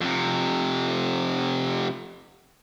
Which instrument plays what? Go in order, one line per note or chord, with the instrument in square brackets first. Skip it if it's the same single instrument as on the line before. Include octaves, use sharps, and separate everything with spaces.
[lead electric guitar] F2 C3